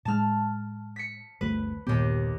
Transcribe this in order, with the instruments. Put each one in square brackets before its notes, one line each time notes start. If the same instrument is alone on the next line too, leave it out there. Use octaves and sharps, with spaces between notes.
[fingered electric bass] A2 G#3 [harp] A5 F6
[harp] B6 C#7
[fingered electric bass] G1 D2 A3 [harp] B4
[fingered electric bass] G1 A#2 B3 [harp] D#2 G4